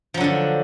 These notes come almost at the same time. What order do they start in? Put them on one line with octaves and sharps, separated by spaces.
F3 F#3 D3 D4